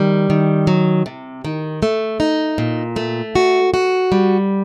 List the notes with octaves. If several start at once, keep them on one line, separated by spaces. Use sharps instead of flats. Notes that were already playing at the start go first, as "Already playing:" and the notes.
Already playing: D#3 G3
D#3
F#3
C3
D#3
A3
D#4
A#2
A3
F#4
F#4
G3